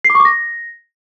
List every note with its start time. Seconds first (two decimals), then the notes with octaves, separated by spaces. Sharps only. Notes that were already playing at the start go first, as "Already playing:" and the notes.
0.05 C7
0.10 D6
0.15 C#6
0.20 D6
0.25 A#6